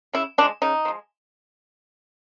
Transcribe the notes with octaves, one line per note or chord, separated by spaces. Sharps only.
C#3 E4
F3 G#3 D4
C#3 D#4
F3 G#3